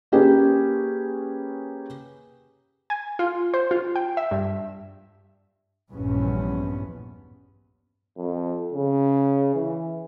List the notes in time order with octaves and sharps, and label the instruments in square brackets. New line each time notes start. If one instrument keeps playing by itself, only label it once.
[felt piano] A#3 C#4 G4 G#4 B4
[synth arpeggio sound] G#5
F4
C5
F4
G5
E5
G2
[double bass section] A#1 E2 G2 B3 C#4
[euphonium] F2
C#3
E3